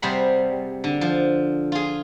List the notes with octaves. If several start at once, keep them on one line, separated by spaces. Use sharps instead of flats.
C3 G3 G#4 C5 F#5 B5
D3
F3
F4 G#4